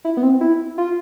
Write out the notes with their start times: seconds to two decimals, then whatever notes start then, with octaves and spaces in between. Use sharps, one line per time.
0.05 E4
0.17 B3
0.23 C4
0.41 E4
0.78 F4